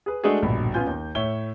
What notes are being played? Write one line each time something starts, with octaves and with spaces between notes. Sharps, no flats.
G#4 B4
G#3 A3 D4 F#4 G#4
D1 A#1 G2 B2 B5
B3 C#4 F4 G#5 G6
D#2
A2 C#5 E5 G7